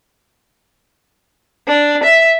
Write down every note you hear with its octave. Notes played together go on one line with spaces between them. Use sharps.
D4
E5